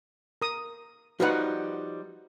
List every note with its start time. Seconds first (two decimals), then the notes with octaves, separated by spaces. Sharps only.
0.42 A#4 D#6
1.20 F3 G3 D#4 F#4 B4 F#5